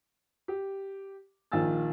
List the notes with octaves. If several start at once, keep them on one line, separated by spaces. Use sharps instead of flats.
G4
A#1 D#3 F4 G#5 E6 A6